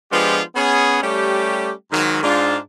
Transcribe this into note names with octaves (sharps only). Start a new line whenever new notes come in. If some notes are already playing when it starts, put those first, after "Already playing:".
F3 G#3 B3 D4 F4 G4
B3 C#4 G#4
G3 A3 C#4 G4
G#2 D#3 F#3
G#2 D4 F4